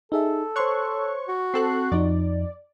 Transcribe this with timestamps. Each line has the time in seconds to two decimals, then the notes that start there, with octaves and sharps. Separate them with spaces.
0.12 D#4 G#4 A4 E5
0.56 C5 C#5 C6 C#6 F#6
1.28 F#4
1.54 C4 A4 F#6 C7
1.92 F2 F3 D#4 D5